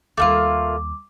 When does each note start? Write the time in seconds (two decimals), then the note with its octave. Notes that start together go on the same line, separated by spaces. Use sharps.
0.17 D#2 G3 A3 A#3 F4 D6